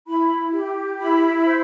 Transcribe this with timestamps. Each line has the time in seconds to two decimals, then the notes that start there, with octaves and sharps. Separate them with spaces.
0.07 E4 B5
0.53 G4
0.99 E4 B5
1.45 C5